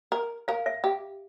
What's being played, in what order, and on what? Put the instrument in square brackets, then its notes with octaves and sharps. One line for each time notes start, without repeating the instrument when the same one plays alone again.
[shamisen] A#4
[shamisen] A#4 [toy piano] F5
[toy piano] E5
[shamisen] G4